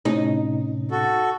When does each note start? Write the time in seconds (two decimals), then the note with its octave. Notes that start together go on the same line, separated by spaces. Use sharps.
0.05 A2 C3 C#4 D#4
0.91 F#4 A4